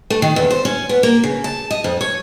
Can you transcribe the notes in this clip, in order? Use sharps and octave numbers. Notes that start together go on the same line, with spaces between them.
A3
D#3
E2
C5
C#4
B3
A#3
C#3
A5
D#5
F2
C#5